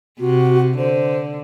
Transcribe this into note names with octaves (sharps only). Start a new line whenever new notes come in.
C3 F#4
D3 C5